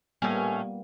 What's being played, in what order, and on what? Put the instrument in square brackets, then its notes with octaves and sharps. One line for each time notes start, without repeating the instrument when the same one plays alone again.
[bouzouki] A2 C#4 [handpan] G3 A#3 B3